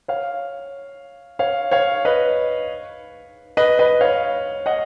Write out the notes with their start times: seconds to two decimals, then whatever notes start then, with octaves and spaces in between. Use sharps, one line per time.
0.08 C#5 F5
1.39 C#5 F5
1.71 C#5 F5
2.05 B4 D#5
3.57 B4 D#5
3.79 B4 D#5
4.01 C#5 F5
4.66 D#5 F#5